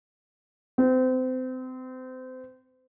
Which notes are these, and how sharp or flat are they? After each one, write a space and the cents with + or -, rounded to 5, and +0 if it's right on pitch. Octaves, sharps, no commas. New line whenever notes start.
C4 -30